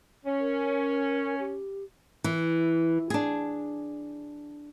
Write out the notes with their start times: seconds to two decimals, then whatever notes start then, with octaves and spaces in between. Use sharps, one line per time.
0.25 C#4
0.40 A#4
1.40 G4
2.24 E3
3.10 D4 G#4